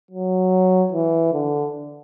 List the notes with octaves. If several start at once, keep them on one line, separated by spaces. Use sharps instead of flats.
F#3
E3
D3